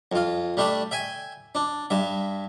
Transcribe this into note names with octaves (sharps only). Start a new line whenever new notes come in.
F2 F4
G3 A3 D4 E5
E5 G5 G#5
D4
G2 E5